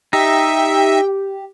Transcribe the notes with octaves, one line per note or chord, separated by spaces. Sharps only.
D#4 G4 E5 G5